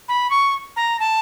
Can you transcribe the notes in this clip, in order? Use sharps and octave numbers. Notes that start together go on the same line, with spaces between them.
B5
C#6
A#5
A5